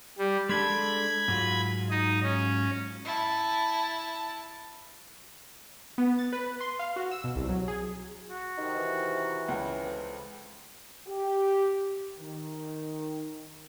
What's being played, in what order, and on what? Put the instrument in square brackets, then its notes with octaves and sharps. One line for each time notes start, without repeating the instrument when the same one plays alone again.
[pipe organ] G3
[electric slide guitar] G#3 D4 A4 [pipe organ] B5 G#6
[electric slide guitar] G#2 F#3 F4
[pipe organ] D#4 D#5
C#4
[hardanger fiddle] E4 A5
[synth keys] B3
A6
B4
C6
F5
F#4
E6
B2
C2
F#3
G#4
[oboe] F#4
[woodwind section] C3 D#3 [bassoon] D#4
[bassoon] E3
[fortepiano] C#2
[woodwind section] F2
[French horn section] G4
D#3